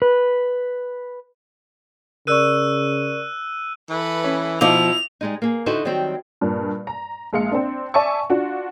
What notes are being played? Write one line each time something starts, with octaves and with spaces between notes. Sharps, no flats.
B4
C#3 A#4 D5 C#6 E6 F#6 D#7
E3 A4 B4
C#4
B2 F3 D#4 E4 F5 D6 F7
G3 G#3 D#4
A#3 G#4
D3 D#4 E4 F#4 A4 C5
D#3 F#3 G3 C4 C5
G2 A#2
A#5
A#1 G#3 F5 C#7
C4 D4
D5 E5 G#5 A5 C#6
D4 F4 F#4